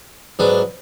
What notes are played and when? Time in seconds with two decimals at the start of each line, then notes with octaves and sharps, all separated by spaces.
0.39 G#2 F#3 B3 D4